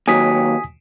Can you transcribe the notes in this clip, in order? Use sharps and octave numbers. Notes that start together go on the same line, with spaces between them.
D#2 F#3 G#5 D#6 B6